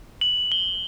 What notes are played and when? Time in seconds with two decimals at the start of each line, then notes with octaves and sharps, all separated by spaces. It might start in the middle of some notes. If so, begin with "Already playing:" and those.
0.21 F#7
0.52 G7